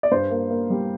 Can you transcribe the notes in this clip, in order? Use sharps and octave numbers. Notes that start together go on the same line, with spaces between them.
D5
G2 C5
A#3
A#3
G3